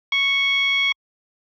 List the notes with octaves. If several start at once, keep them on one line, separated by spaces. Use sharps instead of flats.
C#6